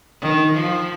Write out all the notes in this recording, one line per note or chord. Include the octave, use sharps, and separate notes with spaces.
D#3
F3